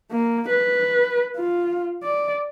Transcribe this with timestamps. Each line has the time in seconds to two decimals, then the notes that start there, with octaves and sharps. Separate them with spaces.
0.11 A#3
0.49 B4
1.37 F4
2.03 D5